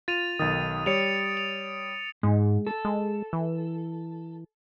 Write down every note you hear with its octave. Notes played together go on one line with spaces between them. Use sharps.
F4 A6 D#7 F7
B1 D#3 D#6 A6
G3 C#5 C#7 D7 F7
F7
G#2 G#3
A4
G#3
E3